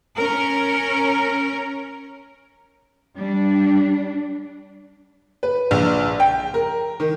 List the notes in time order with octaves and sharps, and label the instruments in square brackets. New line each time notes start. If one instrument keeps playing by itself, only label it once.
[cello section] C#4 A#4
G3 D4
[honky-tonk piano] B4
A#1
G5
A#4
D#3